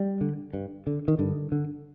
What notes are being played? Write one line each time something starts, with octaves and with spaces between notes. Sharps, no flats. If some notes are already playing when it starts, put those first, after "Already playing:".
Already playing: G3
D3
G2
D3
D#3
G2 D3
D3